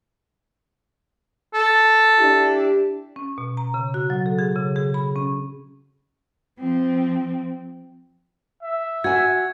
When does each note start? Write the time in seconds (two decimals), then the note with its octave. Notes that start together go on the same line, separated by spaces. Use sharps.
1.54 A4
2.19 D4 E4 G4
3.16 C#4
3.38 B2
3.57 A#5
3.74 C#3
3.94 F#4
4.10 F#3
4.26 A4
4.39 G#4
4.56 C#3
4.76 G#4
4.94 B5
5.16 C#4
6.60 F3 C4
8.63 E5
9.04 F#4 G#5 G#6